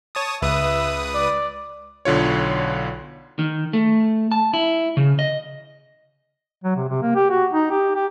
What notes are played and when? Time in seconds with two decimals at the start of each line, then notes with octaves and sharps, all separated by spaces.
0.15 C#5 A5 D#6
0.42 C#2 B4 E5 D#6
1.15 D5
2.05 B1 D3 F4 C#5
3.39 D#3
3.73 A3
4.32 A5
4.54 E4
4.97 C#3
5.19 D#5
6.64 F#3
6.76 C3
6.89 C3
7.02 A#3
7.15 G4
7.30 F#4
7.53 D#4
7.71 G4
7.95 G4